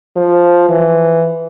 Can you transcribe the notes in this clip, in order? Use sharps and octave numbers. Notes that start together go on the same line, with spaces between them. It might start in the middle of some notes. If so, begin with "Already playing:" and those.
F3
E3